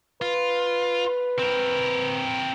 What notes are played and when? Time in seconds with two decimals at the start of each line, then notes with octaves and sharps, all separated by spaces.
0.22 F4 B4
1.39 C4 A#4